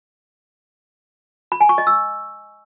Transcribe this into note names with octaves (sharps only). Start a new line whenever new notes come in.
B5
G#5
C#6
D#5
E6